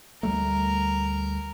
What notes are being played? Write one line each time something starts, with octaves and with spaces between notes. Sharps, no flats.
D2 G3 A3 A#4